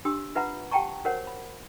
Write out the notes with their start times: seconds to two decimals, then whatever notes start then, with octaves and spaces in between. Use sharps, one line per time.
0.05 D4 G4 C6 D#6 E6
0.35 F4 B4 E5 F#5 A#5 B5
0.71 G4 F#5 G5 A5 A#5 C#6
1.05 F#4 A#4 C5 C#5 F#5
1.27 B5